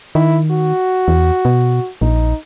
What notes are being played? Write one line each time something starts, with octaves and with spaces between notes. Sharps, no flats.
D#3 E4
F#4
E2
B2
A#1 D#4